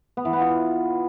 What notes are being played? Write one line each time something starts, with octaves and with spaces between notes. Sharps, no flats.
B3
E3
B3
F4